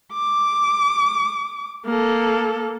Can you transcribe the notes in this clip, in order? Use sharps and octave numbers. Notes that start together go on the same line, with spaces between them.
D6
A#3 A4